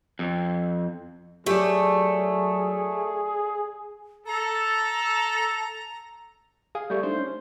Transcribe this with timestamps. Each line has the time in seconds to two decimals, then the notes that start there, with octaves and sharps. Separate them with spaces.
0.19 F2
1.46 F#3 A3 G4 G#4 C#5 D5
4.27 A4 A#5
6.75 G#4 F5
6.90 G3 A3 C#6 G6
7.03 A3 D4 D#4 C5
7.19 C#4